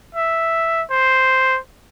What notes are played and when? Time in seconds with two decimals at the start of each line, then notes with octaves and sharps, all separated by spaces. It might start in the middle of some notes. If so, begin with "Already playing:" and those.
0.15 E5
0.90 C5